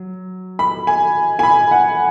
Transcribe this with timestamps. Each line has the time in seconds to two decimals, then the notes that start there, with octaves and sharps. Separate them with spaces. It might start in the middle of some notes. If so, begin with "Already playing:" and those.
Already playing: F#3
0.59 B5
0.87 G#5
1.39 G#5
1.43 B5
1.71 F#5